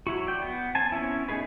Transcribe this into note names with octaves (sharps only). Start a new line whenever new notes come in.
F#3 E4 F#4
D5 G5
B3
C4 G#5 A5
B3 C#4 E4
A3 D#4 G#4 B4